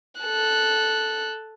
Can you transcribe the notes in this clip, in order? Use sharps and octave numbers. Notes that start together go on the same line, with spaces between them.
A4 F#6